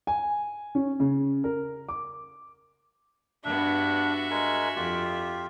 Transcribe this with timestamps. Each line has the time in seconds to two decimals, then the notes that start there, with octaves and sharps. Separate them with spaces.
0.07 G#5
0.75 C#4
1.00 C#3
1.44 A#4
1.89 D6
3.44 G2 B3 D4 F#4 E5
4.31 G#3 A#4 G#5
4.76 F2 F4 G4